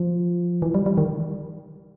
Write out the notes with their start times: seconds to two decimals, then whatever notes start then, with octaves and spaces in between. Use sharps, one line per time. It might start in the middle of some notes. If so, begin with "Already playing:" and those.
Already playing: F3
0.62 E3
0.74 G3
0.86 G3
0.98 D#3